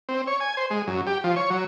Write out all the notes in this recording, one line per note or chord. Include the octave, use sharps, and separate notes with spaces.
C4
C#5
G#5
C5
G#3
F#2
G4
F3
C#5
F#3